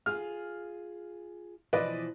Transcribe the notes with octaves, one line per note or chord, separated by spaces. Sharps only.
F4 G#4 F5 F6
B2 E3 F3 B4 D5 D#5